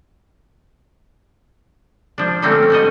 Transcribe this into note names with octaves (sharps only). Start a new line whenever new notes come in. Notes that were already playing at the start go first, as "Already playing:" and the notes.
F3 D4
D3 G3 A3 A#3 C4 C#4
G3 F#4 D#5